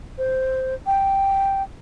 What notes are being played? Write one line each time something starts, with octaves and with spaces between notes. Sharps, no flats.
C5
G5